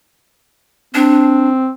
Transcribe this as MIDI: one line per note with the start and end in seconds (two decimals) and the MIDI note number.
0.95 1.70 60
0.95 1.49 62